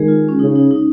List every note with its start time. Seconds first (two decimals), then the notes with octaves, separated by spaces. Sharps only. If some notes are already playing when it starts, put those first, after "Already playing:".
Already playing: D#3 G#3 G#4
0.08 F4
0.29 C#4
0.39 C#3 D#4
0.55 D#4
0.71 D#4